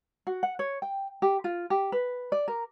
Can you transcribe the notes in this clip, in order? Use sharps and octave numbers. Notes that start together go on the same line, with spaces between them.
F#4
F#5
C#5
G5
G4
F4
G4
B4
D5
A#4